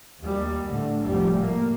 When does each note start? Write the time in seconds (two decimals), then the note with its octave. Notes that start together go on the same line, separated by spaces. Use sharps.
0.20 D#2 G3
0.63 A2 D3
1.02 F1 G3
1.36 A2 A#3